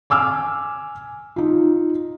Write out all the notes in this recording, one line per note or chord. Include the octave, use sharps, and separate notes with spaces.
G#5 D6 E6 F6
D#4 F4